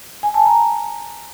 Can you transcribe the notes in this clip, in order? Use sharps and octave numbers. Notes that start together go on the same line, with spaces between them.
G#5
A5
A#5